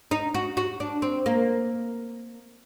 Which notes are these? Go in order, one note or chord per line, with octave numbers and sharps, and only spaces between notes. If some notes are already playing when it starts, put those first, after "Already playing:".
D#4
F#4
F#4
D4
C4
A#3